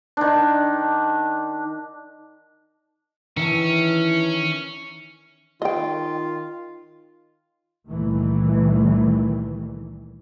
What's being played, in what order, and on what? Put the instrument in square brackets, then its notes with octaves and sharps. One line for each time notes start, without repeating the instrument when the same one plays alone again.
[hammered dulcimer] D#3 D4
[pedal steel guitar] D#3 E5 A5 [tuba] E3 [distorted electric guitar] C#4
[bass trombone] D#3 [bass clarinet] F4 [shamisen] D#5 G5
[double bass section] C#2 A#2 D#3 E3 G3 A3